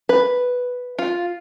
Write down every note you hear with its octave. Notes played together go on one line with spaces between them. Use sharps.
B4
F4